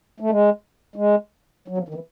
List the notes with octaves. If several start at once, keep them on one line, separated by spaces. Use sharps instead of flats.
A3
G#3
G#3
F#3
F3
D#3
E3